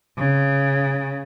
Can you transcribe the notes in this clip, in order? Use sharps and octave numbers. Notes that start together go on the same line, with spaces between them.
C#3